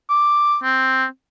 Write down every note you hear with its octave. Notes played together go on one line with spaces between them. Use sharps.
D6
C4